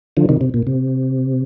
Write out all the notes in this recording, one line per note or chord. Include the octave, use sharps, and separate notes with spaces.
D3 F3
C3 D#3
C3
A#2
C3